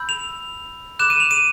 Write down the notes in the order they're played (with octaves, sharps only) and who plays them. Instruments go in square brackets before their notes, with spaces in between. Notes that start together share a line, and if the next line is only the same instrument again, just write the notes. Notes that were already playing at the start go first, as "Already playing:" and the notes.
Already playing: [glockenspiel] B5 E6 G6
F7
B5 D6 F#6 E7
D#7
F7
D#7